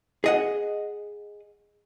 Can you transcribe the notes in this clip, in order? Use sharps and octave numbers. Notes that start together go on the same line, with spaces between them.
G#4 D#5 F#5